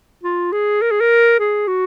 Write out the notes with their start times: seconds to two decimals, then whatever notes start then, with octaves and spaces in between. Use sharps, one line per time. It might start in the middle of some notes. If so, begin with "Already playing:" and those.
0.23 F4
0.53 G#4
0.82 A#4
0.91 G#4
1.00 A#4
1.40 G#4
1.68 F#4